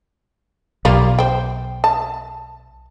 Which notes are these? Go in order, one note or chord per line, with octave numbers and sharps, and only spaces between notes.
B1 G3 A#3 F4
C5 G5
A5